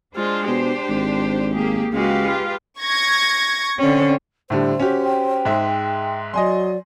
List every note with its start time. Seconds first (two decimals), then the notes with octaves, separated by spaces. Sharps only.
0.16 G#3 D4 F4 C5
0.48 B2 G4
0.89 G#1
1.55 A#3 G4 G#4
1.93 C#2 G#3 F#4 G4 B4 F5
2.27 F4
2.81 C#6 G#6 A#6
3.78 D3 C4 C#4
4.50 A2 D3 G3 C5
4.80 C#4 F#4 G4
5.04 G5
5.45 G#2 G#3 E5
6.34 F#3 D5 D#5 G#5 C6